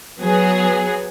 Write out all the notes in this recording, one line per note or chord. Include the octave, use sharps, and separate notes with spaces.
F#3 B3 G#4